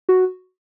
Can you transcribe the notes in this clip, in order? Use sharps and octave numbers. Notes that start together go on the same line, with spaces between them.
F#4